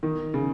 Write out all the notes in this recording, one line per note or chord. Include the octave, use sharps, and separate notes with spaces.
D#3
C#3